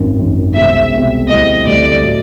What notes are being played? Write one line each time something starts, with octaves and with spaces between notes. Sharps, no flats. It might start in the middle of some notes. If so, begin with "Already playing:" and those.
Already playing: G#1 F#2 D#3
G#1 F#2 D#3
C2 B2 G#3 C4 E5
C2 B2 G#3 C4
D2 D3 G3 C4 E4 D#5
D2 D3 G3 C4 E4 D5
A2 F#3